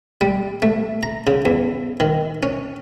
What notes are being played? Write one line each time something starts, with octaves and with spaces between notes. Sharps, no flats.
G3
A3
A#5
C#3
E2
D#3
C#4